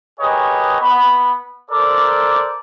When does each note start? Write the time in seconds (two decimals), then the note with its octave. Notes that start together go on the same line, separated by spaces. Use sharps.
0.20 G4 G#4 A#4 B4 C#5 D#5
0.81 B3 B5
1.71 A4 A#4 C5 D5